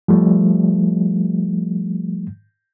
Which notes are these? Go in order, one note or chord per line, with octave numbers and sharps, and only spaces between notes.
F3 G3 A3